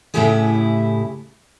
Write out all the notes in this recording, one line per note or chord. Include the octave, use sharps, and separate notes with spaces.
A2 C#3 A3 E4 G4 G#4